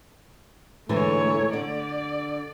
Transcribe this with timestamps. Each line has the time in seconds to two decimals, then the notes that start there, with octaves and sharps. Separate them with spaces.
0.89 G#2 D3 E3 A3 C#5
1.53 D3 D5